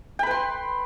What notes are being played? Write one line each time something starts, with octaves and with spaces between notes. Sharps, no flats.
B4 G5 B5 C6